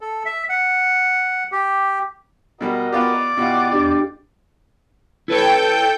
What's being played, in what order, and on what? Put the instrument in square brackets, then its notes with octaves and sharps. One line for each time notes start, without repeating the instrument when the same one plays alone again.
[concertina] A4
E5
F#5
G4
[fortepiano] B2 G3 [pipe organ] F#4 A#4 D#5
[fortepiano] B3 F4 G4 [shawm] D5
[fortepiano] B2 F4 [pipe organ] E4 G4 F#5
[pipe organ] E2 [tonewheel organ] D4 G4
[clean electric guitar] E4 B4 C#5 [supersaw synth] A4 G5 G6